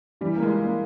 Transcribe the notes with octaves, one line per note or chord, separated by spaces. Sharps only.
E3 G3
A#3
G#3
F4
A#3